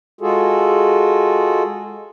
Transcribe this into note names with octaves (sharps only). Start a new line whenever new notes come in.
G#3 F4 F#4 G#4 A4